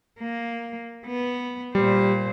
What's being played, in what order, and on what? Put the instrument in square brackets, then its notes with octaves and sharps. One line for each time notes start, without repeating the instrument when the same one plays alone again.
[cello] A#3
B3
[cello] A#2 C5 [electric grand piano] G3